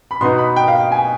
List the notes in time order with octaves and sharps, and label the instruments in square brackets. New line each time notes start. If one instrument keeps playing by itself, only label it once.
[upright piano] B5
B2 B3 D#4 C6
B5
G5
F5
G#5